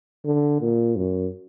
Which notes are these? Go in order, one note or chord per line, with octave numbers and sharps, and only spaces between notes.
D3
A#2
F#2